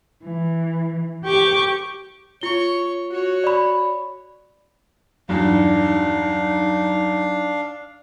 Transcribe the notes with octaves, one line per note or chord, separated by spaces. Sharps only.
E3
G4 G5 C#6 D6
F4 C#5 C#6 G7
F#4 C#5
D5 B5
E2 G2 F#3 D4 D#4 F5